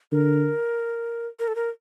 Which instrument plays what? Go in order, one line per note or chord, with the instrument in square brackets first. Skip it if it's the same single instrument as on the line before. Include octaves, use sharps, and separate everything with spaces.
[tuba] D3 [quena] A#4
[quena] A#4
A4
A#4